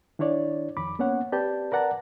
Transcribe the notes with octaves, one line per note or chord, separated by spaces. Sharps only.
D#3 D4 E4 C#5 D5
F2 D#3 B5 D6
A#3 B3 C#4 C#5 F#5
C4 G4 B4 D5 A5 G6
A#4 B4 D5 F#5 A5 A#5